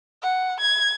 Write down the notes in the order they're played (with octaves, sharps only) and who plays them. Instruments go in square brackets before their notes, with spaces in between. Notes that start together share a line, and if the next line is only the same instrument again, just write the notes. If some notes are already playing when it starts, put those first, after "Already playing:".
[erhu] F#5
G#6